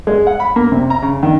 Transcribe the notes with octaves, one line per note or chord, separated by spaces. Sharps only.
G#3
F#5
B5
A#3
C3
A#5
C#3
D#3